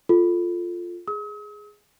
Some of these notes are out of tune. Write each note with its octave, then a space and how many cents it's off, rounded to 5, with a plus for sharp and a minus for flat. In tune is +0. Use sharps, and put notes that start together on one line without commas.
F4 +0 A4 +0
G#4 +0 D#6 +45